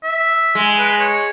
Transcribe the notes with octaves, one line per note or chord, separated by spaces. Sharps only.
E5
G#3
B4
C#5